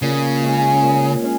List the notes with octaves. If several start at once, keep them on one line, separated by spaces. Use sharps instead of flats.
A#2 C#3
G#3 C#4 G#4
A#2
G#3 C#4 G#4